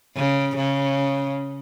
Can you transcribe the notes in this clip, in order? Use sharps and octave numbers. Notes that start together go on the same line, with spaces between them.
C#3
C#3